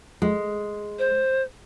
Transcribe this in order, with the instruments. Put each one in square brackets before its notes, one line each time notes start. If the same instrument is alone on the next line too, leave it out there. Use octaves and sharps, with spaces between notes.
[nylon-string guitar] G#3
[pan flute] C5